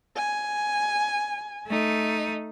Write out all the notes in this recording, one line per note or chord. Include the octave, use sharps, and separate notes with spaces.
G#5
A3 D#4